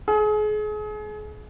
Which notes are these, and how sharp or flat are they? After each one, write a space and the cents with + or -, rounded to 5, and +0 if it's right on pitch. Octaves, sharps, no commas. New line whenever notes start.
G#4 +35